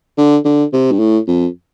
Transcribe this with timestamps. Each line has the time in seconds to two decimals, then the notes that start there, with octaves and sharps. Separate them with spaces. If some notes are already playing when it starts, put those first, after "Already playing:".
0.18 D3
0.45 D3
0.73 C3
0.92 G2
1.00 A2
1.28 F2